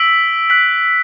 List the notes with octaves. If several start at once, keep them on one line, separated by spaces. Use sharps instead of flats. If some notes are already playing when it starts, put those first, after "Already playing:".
Already playing: E6 B6 D7 F#7
F#6 B6 F#7